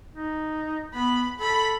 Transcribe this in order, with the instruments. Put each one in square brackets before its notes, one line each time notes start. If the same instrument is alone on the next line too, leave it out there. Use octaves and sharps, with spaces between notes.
[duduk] D#4
[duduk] B3 [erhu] B5
[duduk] A4 [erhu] B5